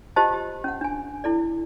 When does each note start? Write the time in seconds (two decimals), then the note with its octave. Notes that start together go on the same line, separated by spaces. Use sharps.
0.16 F4 G4 C5 D#5 A5
0.34 G4
0.64 C#4 F#5
0.81 D4 G#5
1.24 E4 A4 D5